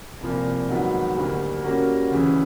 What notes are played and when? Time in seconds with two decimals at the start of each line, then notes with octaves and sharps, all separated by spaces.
0.21 C2 A#2 F3 A#3
0.69 G#2 D#3 F#3 B3
1.16 D2 D3 G3 A#3
1.62 G3 A#3 C#4 F#4 A#4
2.10 D2 C#3 E3